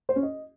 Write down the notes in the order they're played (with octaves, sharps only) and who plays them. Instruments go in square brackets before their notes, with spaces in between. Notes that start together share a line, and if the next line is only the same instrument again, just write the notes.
[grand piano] C5
C#4
D#5